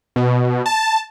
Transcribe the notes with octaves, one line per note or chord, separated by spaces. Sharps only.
B2
A5